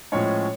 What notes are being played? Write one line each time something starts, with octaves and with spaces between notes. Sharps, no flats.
A2 F3 G#3 C#4 C#5